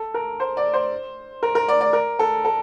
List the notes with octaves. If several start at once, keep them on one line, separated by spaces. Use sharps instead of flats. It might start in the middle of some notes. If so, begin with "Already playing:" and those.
Already playing: A4
A#4
C5
D5
C5
A#4
A#4
D5
D5
A#4
A4
A4